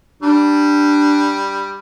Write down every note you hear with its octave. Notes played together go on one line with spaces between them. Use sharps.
G3 D4